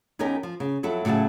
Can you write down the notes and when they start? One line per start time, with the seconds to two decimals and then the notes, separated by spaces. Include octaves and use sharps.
0.19 E2 C#4 D#4 G4 A#4 G5
0.43 F3
0.60 C#3
0.83 F2 F#3 E4 A4
1.05 A2 C#3 F#3 F4 A5